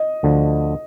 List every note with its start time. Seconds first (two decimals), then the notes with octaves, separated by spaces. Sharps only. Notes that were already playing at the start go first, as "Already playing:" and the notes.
Already playing: D#5
0.23 D2 D3 F3